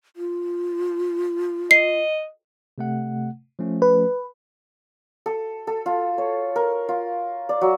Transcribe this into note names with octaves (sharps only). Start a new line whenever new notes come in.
F4
D#5 C7
C3 A3 F#5
F3 A3 C#4
B4
A4
A4
F4
C#5
A#4
F4
D5
F#3